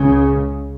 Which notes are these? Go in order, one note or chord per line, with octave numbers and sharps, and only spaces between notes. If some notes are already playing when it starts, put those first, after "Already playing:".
Already playing: C#2 C#3